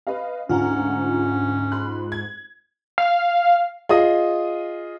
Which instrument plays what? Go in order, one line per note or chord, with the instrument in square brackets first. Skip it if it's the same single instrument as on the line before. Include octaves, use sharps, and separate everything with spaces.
[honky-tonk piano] B4 D#5 F5
[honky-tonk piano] D2 F#5 A#5 [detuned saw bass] G#2 [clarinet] C#4 [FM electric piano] F4
[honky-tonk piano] B5 C6 F#6
G#6
[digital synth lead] F5
[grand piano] F4 G#4 D#5 D#6